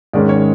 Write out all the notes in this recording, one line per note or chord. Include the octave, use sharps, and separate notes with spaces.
G#2 D#3 G#3 C#4 D5
C#5